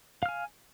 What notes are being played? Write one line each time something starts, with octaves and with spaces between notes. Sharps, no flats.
F5 G#5 F6